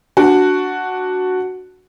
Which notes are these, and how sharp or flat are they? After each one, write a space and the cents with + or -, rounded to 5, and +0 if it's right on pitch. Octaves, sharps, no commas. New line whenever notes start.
D4 +0 F#4 +0